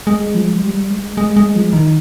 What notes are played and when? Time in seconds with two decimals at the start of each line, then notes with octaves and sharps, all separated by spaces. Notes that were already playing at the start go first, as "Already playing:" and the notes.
0.07 G#3
0.35 F3
0.55 G#3
0.62 G3
0.90 G#3
1.17 G#3
1.37 G#3
1.55 F3
1.73 D#3